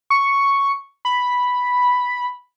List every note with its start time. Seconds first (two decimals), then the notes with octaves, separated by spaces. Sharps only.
0.10 C#6
1.05 B5